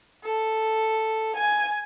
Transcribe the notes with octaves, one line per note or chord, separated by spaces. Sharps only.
A4
G#5